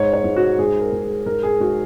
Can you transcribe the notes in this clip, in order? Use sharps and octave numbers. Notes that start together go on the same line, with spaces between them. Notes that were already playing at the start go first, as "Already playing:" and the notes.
Already playing: G#2 C#5
C#5
G#2
F#4
G#2 G#4
A#4
G#2
G#4
G#2 A#4
G#4
G#2 F#4